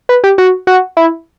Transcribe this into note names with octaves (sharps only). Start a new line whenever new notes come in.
B4
G4
F#4
F#4
E4